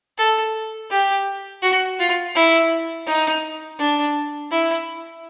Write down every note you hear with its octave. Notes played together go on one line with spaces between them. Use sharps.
A4
G4
F#4
F4
E4
D#4
D4
E4